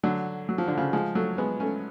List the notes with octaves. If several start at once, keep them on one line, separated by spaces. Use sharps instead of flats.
D3 F#3
F#3
F3
D3
C#3 F3
F3 G#3
F#3 A3
G#3 B3
A3 C#4